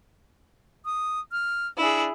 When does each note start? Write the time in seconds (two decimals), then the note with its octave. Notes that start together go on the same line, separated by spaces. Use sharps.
0.85 D#6
1.32 F6
1.78 D4 E4 G#4